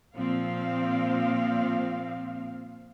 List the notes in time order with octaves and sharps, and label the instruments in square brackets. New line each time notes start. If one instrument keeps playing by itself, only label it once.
[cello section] A#2 F3 C4 F5